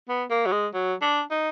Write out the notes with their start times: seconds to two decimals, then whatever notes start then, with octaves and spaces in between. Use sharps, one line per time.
0.09 B3
0.30 A#3
0.46 F#3
0.52 G#3
0.74 F#3
1.02 D4
1.31 D#4